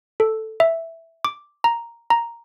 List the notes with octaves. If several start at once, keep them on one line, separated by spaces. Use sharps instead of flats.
A4
E5
D6
A#5
A#5